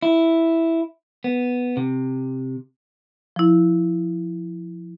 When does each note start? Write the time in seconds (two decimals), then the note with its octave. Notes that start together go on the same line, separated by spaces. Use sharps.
0.02 E4
1.24 B3
1.77 C3
3.36 F3 E4